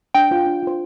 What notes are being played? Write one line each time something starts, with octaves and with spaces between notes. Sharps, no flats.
D4 G5
F4 C5
D4
F4 C5